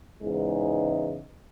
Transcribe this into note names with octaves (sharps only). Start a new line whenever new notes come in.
E2 G#2 C#3 E3 G#3 D#4